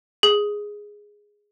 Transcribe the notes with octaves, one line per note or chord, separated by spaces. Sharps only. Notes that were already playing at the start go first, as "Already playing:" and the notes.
G#4